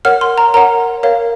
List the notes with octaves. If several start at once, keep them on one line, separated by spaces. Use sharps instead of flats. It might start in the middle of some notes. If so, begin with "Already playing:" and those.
A#4 C#5 F#5 F6
C6
A#5
A#4 C#5 F#5 A#5
A#4 C#5 F5